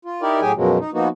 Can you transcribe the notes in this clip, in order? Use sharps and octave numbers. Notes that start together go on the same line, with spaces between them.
F4
D#4 E4 G4 A#4 D5
A2 F#3 G4 G#4 G5 G#5
F#2 B2 F3 F#3 G#3
D#4
F3 A#3 B3 D#4 F#4